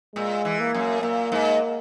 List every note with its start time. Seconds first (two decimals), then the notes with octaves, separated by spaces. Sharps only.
0.16 A#2 G#3
0.45 E3
0.60 A#3
0.74 F#2
1.02 A#2 A#3
1.32 G#2